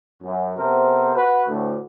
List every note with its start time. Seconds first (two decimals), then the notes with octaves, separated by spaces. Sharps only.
0.23 F#2
0.58 C3 B3 A4 A#4 C5
1.16 F#4 B4
1.48 D2 A2